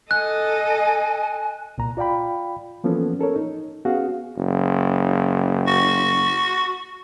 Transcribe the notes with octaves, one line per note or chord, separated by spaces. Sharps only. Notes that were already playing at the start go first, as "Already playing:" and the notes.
A4 D#5 G#5 F#6
C2 A#2 A#5
F4 D5 F5 G5 B5
E3 F3 A#3 B3 C#4 A4
C#4 A4 A#4 C#5
D#4
B3 C#4 F#4 G#4 F5
F#1
F#4